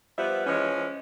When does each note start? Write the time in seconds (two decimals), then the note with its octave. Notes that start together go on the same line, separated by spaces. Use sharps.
0.18 F3 G3 B3 B4 E5
0.47 E3 F3 G#3 C#4